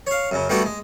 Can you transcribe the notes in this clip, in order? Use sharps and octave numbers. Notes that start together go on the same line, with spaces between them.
C#5 F5
F#2 C#3
G3 A3 B3 D4 E4 F#4
G#3